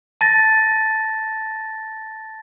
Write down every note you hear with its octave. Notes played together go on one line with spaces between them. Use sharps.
A5 A6 A#6